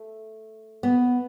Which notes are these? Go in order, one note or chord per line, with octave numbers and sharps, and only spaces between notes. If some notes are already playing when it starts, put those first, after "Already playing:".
Already playing: A3
B3